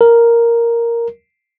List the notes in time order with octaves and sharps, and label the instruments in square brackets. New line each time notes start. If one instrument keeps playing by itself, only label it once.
[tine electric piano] A#4